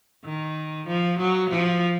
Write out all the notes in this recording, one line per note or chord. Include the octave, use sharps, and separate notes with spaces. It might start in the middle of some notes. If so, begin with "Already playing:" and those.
D#3
F3
F#3
F3